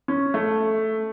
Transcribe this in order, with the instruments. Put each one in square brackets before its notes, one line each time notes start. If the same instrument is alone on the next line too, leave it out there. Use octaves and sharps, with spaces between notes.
[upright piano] C#4
A3